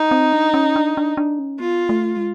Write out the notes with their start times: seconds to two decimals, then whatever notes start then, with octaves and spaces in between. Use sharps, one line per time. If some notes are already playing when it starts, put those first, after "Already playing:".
Already playing: D#4
0.11 C4
0.33 D4
0.54 C#4
0.76 D4
0.97 D4
1.17 D4
1.39 C#4
1.60 B3 F4
1.89 A3
2.17 G#3